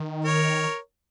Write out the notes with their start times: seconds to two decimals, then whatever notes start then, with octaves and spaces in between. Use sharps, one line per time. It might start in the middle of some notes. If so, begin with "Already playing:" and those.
Already playing: D#3
0.25 A#4 C#5